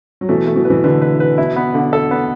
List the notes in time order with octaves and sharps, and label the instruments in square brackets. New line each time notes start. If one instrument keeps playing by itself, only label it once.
[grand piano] F#3
[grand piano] B2 E3 [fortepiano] A3
[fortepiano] A3
[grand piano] B2 E3
[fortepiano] B4
[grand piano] B2 E3
[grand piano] D3 [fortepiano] B4
[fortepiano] B4
B4
[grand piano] B2 [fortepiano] E4
[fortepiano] B3
D3
A4
B3